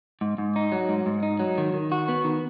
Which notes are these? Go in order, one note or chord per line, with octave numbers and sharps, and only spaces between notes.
G#2
G#2
D#4
F#3
G#2
G#2
D#4
F#3
D#3
D#3
F#4
B3
D#3